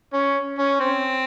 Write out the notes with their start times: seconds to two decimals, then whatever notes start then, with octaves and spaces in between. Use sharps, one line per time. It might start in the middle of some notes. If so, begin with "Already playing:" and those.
0.13 C#4
0.59 C#4
0.80 C4